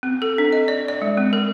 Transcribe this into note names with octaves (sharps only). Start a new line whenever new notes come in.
C4
A4
D4
D#5
D5
D5
G#3
C4
A#4